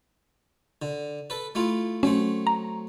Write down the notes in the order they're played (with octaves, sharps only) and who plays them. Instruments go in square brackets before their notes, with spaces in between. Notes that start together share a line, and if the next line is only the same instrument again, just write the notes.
[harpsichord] D3
A4 B4
A3 E4 F4
[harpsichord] F#3 A3 C4 [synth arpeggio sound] C#4
[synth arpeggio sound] A#5